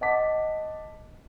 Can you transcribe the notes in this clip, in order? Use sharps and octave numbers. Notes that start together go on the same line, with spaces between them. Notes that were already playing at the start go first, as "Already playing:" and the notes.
D#5 F#5 A5 D6 B6